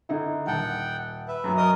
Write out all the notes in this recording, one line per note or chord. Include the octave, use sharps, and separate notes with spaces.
D3 D#4 E4
D#1 F#5 G5 A5
B4 E5
F#2 F#3
A#4 D#5 D#6